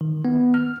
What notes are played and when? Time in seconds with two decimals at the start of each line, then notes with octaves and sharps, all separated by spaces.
0.01 D#3
0.25 B3
0.54 F6